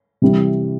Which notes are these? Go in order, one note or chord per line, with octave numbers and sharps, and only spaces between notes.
C3 E3 G3 C4